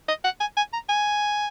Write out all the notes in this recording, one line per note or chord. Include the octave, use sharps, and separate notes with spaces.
D#5
F#5
G#5
G#5
A#5
G#5